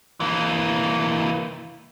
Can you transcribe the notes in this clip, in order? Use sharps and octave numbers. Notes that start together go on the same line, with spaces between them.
E3 A#3